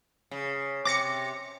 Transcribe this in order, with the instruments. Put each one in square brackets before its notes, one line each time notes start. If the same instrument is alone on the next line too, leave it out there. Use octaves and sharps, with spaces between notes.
[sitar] C#3
[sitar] C3 [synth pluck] D6 A#6 C#7